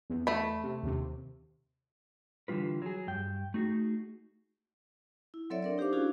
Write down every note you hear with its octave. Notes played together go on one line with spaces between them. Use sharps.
E2
A3 B5
C3
D#2 C3
D3 E3 G3 F4 B4
F#3 G#4
G2 G5
A3 D#4 F#4 G#4
E4
F#3 C4 A4 C#5 D5 E5
D4 A#4 D5
D#4 G4 C5 F5 D6
C#4 D4 E4 F#4 G#4